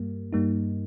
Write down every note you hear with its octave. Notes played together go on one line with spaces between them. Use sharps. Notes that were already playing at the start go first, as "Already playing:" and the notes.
Already playing: G2 G3 A#3
G2 G3 A#3 D#4